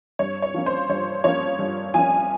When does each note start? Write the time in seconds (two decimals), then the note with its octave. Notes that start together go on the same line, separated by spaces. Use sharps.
0.19 G2 C#5
0.42 C#5
0.54 F3 A#3 C#4
0.66 C5
0.90 G2 C#5
1.24 F3 A#3 C#4 C#5
1.59 G2
1.94 F3 A#3 C#4 G#5